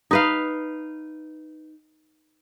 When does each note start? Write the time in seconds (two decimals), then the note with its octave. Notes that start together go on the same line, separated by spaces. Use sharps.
0.11 D#4 B4 F5